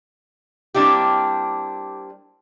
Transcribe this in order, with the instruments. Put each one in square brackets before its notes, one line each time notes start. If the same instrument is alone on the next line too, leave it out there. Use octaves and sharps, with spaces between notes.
[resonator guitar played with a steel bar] G3 A#3 C4 D4 E4 G4